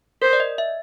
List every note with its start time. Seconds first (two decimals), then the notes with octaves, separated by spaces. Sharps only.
0.22 A#4 C5
0.33 D5
0.40 D#5
0.58 E5